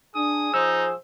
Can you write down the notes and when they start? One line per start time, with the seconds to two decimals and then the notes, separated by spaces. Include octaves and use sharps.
0.15 D4 G#4 D#6
0.54 F3 D#4 C5 E6